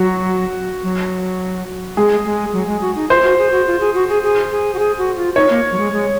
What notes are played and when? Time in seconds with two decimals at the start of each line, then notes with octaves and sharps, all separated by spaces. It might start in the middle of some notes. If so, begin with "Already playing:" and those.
Already playing: F#3 F#4
0.83 F#3
1.97 G#3 G#4
2.25 G#3
2.53 F#3
2.67 G#3
2.81 F#4
2.96 D#4
3.09 F4 C5
3.23 F#4
3.38 G#4
3.52 F#4
3.67 F4
3.80 G#4
3.94 F#4
4.09 G#4
4.23 G#4
4.51 G#4
4.74 F#4
4.79 G#4
4.99 F#4
5.17 F4
5.36 D#4 C#5
5.50 A#3
5.72 F#3
5.79 G#3
5.92 G#3